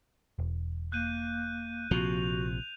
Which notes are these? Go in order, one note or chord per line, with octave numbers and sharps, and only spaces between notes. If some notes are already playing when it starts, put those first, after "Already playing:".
E1
A#3 F#6 G6 D#7
A#1 C3 F3 F#4 F7